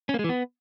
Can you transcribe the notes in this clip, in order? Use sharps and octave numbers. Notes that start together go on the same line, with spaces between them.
C#4
A#3
G#3
E3
B3